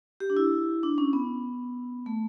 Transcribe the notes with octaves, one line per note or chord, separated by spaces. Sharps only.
G4
D4
E4
D4
C#4
B3
A3